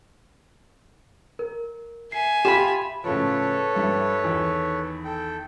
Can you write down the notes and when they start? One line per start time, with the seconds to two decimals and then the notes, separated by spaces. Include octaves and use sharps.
1.39 A#4
2.12 E5 G#5 C7
2.45 F4 G4 B5 E7
3.04 A2 C#3 F3 A4 B4 C#5
3.75 G2 G3 E4
4.23 E2 D#3 E3
5.04 A4 G5